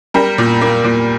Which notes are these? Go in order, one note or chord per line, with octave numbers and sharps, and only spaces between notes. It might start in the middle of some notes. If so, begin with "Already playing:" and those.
G3 A#4
A#2
A#3
A#2